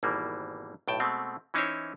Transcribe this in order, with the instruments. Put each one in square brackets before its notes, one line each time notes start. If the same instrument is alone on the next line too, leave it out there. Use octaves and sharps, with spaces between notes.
[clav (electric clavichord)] G#1 B2 E3 G3 A#3
B1 A2 G5 A5
B2 G#3 A3 C4
E3 C#4 D#4 E4 C5 C#5